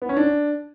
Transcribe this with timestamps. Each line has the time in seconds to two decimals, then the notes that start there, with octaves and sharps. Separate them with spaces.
0.02 B3
0.09 C#4
0.17 D4